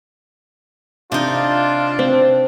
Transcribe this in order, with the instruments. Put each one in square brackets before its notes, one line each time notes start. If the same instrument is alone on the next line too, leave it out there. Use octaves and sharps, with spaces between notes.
[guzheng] C3 D#4 [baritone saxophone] D4 [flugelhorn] F4
[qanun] C4